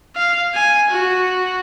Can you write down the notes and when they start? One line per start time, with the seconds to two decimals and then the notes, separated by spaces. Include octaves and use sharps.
0.16 F5
0.54 G#5
0.91 F#4